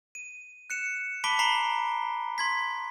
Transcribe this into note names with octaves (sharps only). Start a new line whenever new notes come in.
D#7
F#6 C#7 E7
A5 B5 D6 B6 D7 G7
A#5 B5 C7 G7
C6 G#6 B6